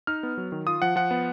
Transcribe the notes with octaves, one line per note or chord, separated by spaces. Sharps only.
D#4 F6
B3
F#3
D#3
F4 D#6
F3 F#5
F3 F#5
B3